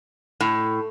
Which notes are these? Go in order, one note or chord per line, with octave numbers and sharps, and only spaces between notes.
A2